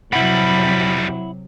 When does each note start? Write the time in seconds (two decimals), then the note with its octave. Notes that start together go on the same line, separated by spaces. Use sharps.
0.13 F2 C3 F#3 G3 E4 F#5 B5